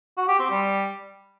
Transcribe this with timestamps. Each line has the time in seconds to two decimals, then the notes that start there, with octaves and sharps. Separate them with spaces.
0.17 F#4
0.28 G4
0.39 C4
0.50 G3